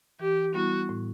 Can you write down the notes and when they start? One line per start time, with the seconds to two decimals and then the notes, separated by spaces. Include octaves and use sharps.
0.20 E3 G4
0.54 G3 B3 E4 F#4
0.89 A2